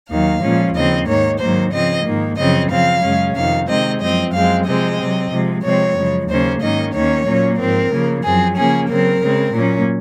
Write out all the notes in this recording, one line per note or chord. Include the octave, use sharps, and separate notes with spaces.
D#2 D#3 F#3 F5
A#2 F3 G#3 C#4
D#2 C#3 F3 C4 D#5
G#2 D#3 A#3 C#5
G#2 D#3 F#3 A#3 C5
C#3 F3 C4 D#5
G#2 D#3 A#3
F#2 C#3 F3 C4 D#5
C#3 F3 C4 F5
F#2 C#3 G#3 C#4
F2 C3 D#3 F5
C3 D#3 G#3 C4 D#5
F#2 F3 C4 D#5
F#2 F3 G#3 C4 F5
C3 F3 G#3 C4 D#5
C3 F#3 C4
C3 F3 G#3
C3 F3 G#3 C4 C#5
F#2 C#3 F3 G#3
D#2 C#3 F#3 A#3 C#4 C5
G#2 D#3 A#3 C#4 D#5
D#2 D#3 A#3 C#4 C#5
A#2 F#3 A#3 C#4
G#2 F3 C4 A#4
C#3 F3 A#3
F#2 F3 C4 G#4
C#3 F3 A#3 C#4 G#4
C#3 F#3 C4 A#4
C#3 G#3 C4
A#2 F#3 A#3 C#4